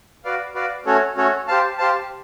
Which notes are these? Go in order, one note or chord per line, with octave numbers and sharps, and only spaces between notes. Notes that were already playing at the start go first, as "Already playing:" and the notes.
F#4 B4 D5 F5
F#4 B4 D5 F5
A3 C#4 F#4 A4 C#5
A3 C#4 F#4 A4 C#5
G4 C5 F5 A5
G4 C5 F5 A5